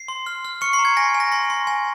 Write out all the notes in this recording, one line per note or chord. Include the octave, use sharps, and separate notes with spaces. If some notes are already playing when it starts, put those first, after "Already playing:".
Already playing: C7
C6
F6
F6
C#6 F6 C#7
C6 C7
A#5
G#6
G#5 A#6
G#5
A#6
C6 A#6
C6
G#5